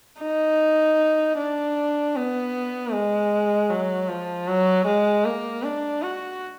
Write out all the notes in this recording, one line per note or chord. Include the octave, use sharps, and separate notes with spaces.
D#4
D4
B3
G#3
F#3
F3
F#3
G#3
A#3
D4
F#4